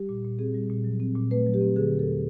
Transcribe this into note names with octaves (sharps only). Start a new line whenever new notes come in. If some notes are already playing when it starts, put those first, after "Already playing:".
Already playing: G3 G4
A#2
A#2
C4 G#4
G3
A#2
F#3
C4
A#2
A3 B4
F#3
G4
C4
D3 G#4
D#2
A4